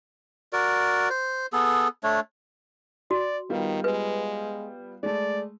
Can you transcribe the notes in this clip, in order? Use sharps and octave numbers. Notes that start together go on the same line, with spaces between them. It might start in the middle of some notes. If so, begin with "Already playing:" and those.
F#4 A#4 D5
C5
B3 G#4 A4
A3 D4 C#5
F#4 D5
D#3 G3 B3 F4
G#3 B4
G#3 A3 D5